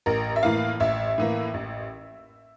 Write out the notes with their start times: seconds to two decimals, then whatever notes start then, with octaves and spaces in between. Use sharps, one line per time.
0.06 A1 A#4
0.36 E5
0.43 A2 E3 A#3 F5
0.80 A1 E5
1.18 A2 E3 A#3
1.54 A1